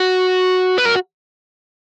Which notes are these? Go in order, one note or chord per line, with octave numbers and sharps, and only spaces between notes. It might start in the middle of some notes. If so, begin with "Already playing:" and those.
Already playing: F#4
B4
A#4